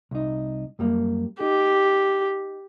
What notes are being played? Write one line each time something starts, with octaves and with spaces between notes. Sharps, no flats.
C2 D#4
F#2 G3 A#3
D#4 G4